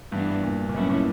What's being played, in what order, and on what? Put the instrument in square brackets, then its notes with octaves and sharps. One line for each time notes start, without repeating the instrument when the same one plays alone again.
[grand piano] G2 [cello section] E3 B3 D4
[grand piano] A#2
A#2
[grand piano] B2 [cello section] F#3 C#4 E4
[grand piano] A#2